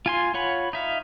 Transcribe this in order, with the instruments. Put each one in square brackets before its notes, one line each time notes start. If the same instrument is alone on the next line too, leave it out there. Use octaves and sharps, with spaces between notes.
[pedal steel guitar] F4 G#5 C6
F4 C#5 F#5 B5
D#4 E5 F5